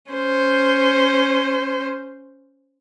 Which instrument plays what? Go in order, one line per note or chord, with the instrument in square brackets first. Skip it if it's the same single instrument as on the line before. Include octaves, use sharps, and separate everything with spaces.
[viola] C#4 C5